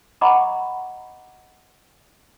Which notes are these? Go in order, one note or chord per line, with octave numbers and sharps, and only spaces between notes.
D#5 F#5 A#5 B5 C#6 D6